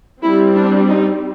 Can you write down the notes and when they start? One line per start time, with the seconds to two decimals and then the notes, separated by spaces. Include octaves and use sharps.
0.21 G3 C4 E4
0.55 D4
0.89 D#4